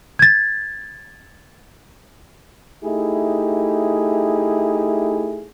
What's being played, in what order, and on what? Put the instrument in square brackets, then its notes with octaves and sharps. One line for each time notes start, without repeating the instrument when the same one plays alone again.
[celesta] G#6 A6
[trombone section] A3 D#4 E4 G4 G#4